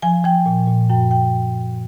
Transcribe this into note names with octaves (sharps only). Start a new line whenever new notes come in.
F3 G#5
F3 G5
A#2
A#2
F#2 G5
G5